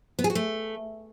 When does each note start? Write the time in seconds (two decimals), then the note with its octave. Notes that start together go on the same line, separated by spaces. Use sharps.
0.19 B3
0.24 G#4
0.30 F#4
0.35 A3